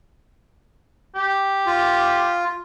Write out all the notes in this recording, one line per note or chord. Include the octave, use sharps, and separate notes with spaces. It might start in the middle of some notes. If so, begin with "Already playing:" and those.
G4
F4